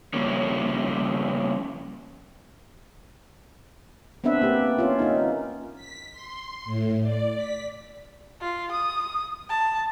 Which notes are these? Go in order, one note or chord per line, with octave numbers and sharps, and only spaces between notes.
C#3 F3 G3 A#3 C#4
B3 C4 D4 B4 E5
A#3 G4
C#4 F4
A#3 D#4
B6
C6
A2
D5
B6
F4
D#6
A5